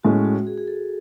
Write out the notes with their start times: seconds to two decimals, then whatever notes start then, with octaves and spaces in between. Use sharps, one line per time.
0.03 A2 G#3 C#4 F#4
0.25 F#4
0.47 G#4
0.58 G#4
0.67 A4